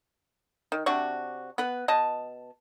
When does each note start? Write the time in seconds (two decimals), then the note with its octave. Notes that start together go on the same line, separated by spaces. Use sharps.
0.72 D#3
0.86 C3 D4 F#4 C#6
1.58 B3 B4
1.88 B2 D#5 A5